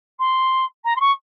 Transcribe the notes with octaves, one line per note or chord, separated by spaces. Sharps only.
C6
A#5
C6
C#6